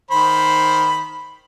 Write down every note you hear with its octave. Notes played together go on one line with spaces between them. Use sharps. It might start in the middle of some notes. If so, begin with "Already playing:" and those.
D#3 C5 B5